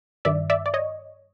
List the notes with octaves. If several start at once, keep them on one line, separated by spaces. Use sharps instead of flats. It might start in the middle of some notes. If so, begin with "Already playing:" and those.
G2 D#3 D5 E5
D5 E5
D5
C#5 D#5